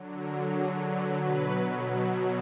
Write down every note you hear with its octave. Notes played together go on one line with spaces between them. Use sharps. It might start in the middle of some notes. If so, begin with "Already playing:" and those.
Already playing: D3 F#3
A#4
D3 F#3 G#4
B4
B2 F#3 B4
B2 F#3